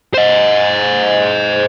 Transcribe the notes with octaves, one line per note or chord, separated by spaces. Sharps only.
C5 D#5